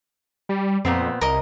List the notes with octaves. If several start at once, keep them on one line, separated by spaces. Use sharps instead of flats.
G3
F2 A#2 B3 C4
C2 A#4 D#5